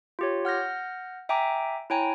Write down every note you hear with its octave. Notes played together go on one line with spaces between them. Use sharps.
F4 G4 C#5
F#5 F6 G6 A#6
E5 G5 G#5 A#5 D6
E4 C#5 G5 G#5 A#5